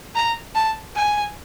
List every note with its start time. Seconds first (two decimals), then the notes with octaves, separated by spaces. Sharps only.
0.15 A#5
0.55 A5
0.96 G#5